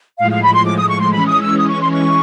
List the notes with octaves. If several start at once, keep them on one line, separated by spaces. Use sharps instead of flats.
A2 F3 G#3 F5
F5
B5
C6
D6
D#6
C#6
C6
E3 G#3 C#4 B5
D#6
E6
D#6
C#6
C6
C#6